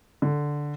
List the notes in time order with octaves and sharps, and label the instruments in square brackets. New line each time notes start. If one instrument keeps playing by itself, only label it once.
[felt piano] D3